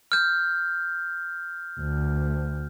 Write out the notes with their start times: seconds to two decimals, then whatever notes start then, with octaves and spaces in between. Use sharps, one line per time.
0.12 F6 G6
1.80 D2